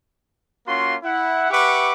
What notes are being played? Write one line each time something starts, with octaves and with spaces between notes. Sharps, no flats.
A#3 C#4 F4 F#4 C6
E4 F#5
G4 B4 E5 F#5 C#6 D6